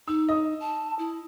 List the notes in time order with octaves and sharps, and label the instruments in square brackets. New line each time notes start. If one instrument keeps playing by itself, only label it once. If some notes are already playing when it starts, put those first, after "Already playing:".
[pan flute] D#4 [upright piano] E6
[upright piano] D#5 D#6
[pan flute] A5
E4